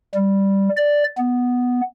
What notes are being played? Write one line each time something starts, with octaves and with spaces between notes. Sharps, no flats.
G3
D5
B3